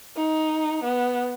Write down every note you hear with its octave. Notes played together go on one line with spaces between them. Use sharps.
D#4
B3